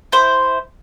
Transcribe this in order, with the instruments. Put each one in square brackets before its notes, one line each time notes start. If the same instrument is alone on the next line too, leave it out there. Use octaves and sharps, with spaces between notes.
[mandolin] E4 C5